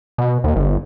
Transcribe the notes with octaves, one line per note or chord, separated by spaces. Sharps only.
B2
D#2
G1